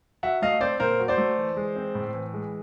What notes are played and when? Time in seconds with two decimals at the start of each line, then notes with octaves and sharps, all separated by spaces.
0.23 F#3 E5 F#5
0.42 A3 D#5 F5
0.61 C4 C5 D5
0.80 A#2 A#4 C5
1.00 F#3
1.08 C5 D5
1.18 A3
1.38 E3
1.57 G#3
1.76 C4
1.95 A2
2.14 E3
2.34 G#3